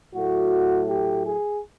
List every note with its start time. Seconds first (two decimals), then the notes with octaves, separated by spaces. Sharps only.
0.15 A2 F#3 A3 F#4
0.89 G4
1.27 G#4